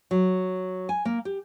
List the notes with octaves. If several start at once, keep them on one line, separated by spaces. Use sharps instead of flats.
F#3
G#5
A#3
G4